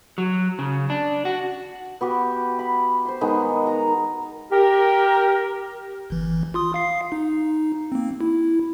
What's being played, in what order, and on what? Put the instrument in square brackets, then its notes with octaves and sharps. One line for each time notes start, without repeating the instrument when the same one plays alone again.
[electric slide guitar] F#3
C#3
D4
F#4
[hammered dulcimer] B3 F#4 G4
B5
C5 C6
D#3 G#3 B3
A#5
[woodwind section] G4 A#4
[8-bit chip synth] G1 E3
F4 C6 D#6
F5 C7
D#4
A#3 C4
E4